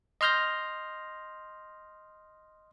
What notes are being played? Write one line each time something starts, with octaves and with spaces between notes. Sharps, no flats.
D#5 C6 F6 G6 A#6